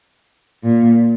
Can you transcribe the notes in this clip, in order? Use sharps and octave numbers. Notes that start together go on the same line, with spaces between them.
A#2